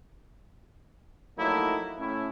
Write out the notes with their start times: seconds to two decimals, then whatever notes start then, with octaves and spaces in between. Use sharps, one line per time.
1.38 F3 F#3 A3 A#3 D#4 E4
1.99 A2 C#4 E4